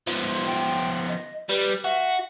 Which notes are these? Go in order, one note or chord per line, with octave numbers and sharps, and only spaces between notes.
F3 B3
G5
D#5
G3 B4
F#4 E5